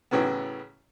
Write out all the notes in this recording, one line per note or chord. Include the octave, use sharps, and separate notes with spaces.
A2 C#3 E3 F#3 B3